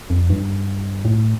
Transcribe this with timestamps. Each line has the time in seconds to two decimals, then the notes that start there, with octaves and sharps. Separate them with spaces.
0.10 F2
0.30 G2
1.05 A2